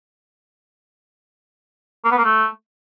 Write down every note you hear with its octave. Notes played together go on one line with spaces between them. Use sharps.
A#3
B3
A#3
A3